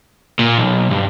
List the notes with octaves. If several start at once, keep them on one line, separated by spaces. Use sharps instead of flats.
A#2
B1
G2